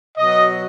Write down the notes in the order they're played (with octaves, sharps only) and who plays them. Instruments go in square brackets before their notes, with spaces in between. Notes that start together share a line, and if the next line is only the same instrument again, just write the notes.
[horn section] B2 F#3 D#5